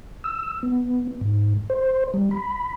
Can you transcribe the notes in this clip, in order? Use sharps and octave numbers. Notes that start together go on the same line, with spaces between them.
E6
B3
G#2
C5
G3
B5